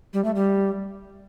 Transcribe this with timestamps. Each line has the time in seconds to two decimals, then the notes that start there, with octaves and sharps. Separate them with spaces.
0.13 G3
0.24 A3
0.35 G3